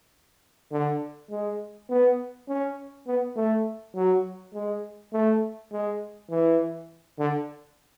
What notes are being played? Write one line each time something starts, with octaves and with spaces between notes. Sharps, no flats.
D3
G#3
B3
C#4
B3
A3
F#3
G#3
A3
G#3
E3
D3